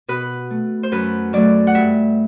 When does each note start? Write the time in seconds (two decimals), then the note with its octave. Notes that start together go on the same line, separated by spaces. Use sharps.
0.08 B2 B4
0.50 A3
0.83 C5
0.92 F#2 B4
1.33 F#3 A3 D5
1.67 F#5
1.75 G2 E5